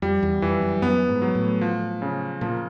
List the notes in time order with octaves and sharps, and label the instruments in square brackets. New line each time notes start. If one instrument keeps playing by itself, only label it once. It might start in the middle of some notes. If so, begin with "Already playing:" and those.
[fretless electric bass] F2 [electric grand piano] G3
[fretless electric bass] E2
[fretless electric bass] F2 [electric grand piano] E3
[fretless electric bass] F#2
[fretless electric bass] F#2 [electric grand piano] B3
[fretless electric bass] G#2
[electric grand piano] F#3
[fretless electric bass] A2
[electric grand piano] F3
C#3
[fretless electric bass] A#2 [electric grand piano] F3